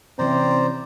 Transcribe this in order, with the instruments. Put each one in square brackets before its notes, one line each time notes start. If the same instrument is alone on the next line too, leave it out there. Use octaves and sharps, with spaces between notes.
[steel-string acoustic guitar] C3 E3 C#4 [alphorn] C4 [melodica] C5 D5 A#5